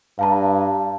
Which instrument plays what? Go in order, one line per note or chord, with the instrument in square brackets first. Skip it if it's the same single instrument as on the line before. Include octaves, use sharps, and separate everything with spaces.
[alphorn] G2 [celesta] F5 A5 A#5